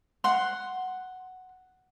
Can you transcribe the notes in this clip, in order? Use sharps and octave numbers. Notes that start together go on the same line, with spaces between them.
F#5 C6